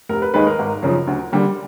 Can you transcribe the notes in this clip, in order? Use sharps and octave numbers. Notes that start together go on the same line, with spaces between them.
F1 A#4
B4
D#2 D#3 G#3 B4
A#4
G#1
F#2 C#3 F3
D2
D3 G3 A#3